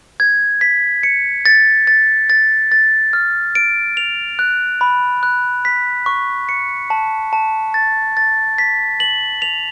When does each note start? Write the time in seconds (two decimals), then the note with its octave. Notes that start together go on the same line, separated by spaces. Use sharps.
0.20 G#6
0.61 B6
1.03 C#7
1.46 A6
1.87 A6
2.30 A6
2.72 A6
3.13 F6
3.55 D7
3.97 F7
4.39 F#6
4.81 B5
5.23 F#6
5.65 B6
6.06 C#6
6.49 C#7
6.90 A5
7.33 A5
7.74 A6
8.17 A6
8.58 B6
9.00 F#7
9.42 F7